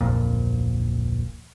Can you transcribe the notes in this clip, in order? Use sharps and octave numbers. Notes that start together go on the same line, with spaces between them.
D1 A#1 F2 A#2